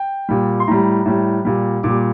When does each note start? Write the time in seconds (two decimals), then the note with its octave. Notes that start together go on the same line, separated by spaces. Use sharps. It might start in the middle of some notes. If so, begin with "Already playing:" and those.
Already playing: G5
0.29 A#2 G3
0.60 C6
0.67 A2 G3 A#5
1.05 A2 G3
1.45 A#2 G3
1.83 A#2 G3 D6